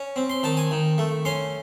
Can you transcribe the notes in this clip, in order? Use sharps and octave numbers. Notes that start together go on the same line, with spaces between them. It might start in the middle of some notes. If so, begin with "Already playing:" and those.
Already playing: C#4
C4
C6
D#3 A5
G#5
D#3
A3
C#4 C6